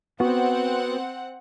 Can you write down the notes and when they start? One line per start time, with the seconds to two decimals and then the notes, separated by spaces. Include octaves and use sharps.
0.20 B3 C4 F#4 F#5